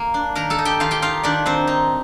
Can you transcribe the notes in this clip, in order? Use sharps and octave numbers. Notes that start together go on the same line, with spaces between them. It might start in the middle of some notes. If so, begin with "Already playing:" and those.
Already playing: A#3
D4
D#3 A#4 A#5
A4 A5
D#4
G4 G5
D#3 F4 F5
G4 G5
D#4 F4 F5
D#3 D4 D5
D#3 C4 C5
D#4